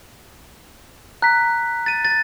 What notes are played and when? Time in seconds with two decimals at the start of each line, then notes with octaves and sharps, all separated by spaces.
1.22 A#5 F#6 B6
1.86 A6 D#7
2.05 A6